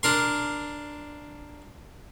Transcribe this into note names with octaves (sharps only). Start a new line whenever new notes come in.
D4 A#4 C6